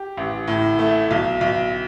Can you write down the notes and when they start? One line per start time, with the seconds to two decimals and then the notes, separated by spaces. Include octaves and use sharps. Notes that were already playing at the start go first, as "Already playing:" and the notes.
Already playing: G4
0.17 A1
0.47 A2
0.79 A3
1.11 B1
1.41 B1